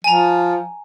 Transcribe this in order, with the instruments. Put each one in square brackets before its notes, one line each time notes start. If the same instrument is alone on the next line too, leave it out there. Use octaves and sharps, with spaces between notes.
[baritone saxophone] F3 [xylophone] G#5 A#5